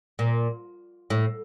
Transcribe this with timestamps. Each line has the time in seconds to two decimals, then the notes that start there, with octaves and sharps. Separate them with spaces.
0.19 A#2
1.10 A2